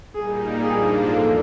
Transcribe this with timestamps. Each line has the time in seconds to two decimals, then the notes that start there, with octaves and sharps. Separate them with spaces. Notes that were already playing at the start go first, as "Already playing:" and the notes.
0.14 A#2 G3 A#3 D#4 G#4
0.62 G#2 F3 A#3 D4 G#4
1.11 E2 A4